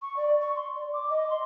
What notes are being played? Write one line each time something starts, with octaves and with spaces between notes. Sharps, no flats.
C#6
D5
C#6
C6
D5
D6
D#5
C6